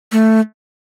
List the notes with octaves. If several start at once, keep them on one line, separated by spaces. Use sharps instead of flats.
A3